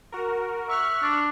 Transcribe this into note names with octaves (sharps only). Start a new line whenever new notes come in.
F#4 A#4
E5 C#6 F6 F#6
D4